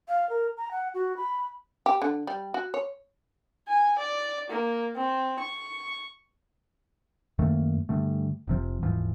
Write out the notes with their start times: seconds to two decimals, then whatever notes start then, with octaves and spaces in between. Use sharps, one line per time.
0.08 F5
0.29 A#4
0.57 A#5
0.71 F#5
0.94 F#4
1.17 B5
1.86 G4
2.02 D3
2.27 G3
2.54 F#4
2.74 C#5
3.68 G#5
3.98 D5
4.50 A#3
4.96 C4
5.40 C#6
7.39 F#2 D#3 A3 A#3
7.89 G2 D3 A3
8.47 F1 C3 F3
8.83 D#1 G#2 E3 F3